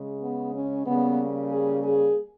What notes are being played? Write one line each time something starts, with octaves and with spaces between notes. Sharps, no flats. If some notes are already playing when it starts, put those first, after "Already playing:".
Already playing: C#3 G#3
B3
C#4
C#3 G3 A#3 B3
G#4
G#4